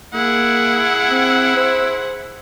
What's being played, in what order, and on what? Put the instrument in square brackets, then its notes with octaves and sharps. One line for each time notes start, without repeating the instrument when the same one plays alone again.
[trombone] A#3 [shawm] E4 [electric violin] G#4 F#5
[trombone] C4
C5